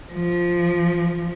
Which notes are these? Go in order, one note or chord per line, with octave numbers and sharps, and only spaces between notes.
F3